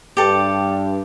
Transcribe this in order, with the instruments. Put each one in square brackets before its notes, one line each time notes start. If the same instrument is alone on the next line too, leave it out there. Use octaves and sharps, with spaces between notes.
[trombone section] G2 [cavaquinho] G4 A4